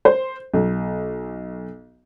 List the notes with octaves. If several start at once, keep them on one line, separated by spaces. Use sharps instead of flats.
C5
B1